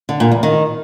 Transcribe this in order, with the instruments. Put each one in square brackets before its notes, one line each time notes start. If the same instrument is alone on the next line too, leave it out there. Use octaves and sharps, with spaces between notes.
[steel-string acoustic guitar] D3
A#2
E2
D#3